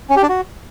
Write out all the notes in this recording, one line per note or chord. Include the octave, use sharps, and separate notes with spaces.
C#4
G4
D4
F#4